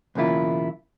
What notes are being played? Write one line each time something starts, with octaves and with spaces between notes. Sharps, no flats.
B1 E2 C#3 A#3 E4 F4